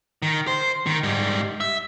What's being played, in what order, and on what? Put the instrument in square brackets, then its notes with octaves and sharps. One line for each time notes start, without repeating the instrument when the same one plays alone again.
[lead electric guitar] D#3
C5
D#3
G#2 G3
E5